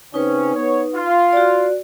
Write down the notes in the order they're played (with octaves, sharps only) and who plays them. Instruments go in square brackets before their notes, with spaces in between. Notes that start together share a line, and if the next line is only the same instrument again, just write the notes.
[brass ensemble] C#3 C4 C#4 [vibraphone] D#4 B4
[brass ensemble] B3 C#5
F4
[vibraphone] F#4 D5